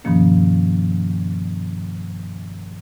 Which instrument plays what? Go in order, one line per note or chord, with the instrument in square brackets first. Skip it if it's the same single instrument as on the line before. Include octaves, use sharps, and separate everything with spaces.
[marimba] G2 B2 D#3 F3 A#3 C#4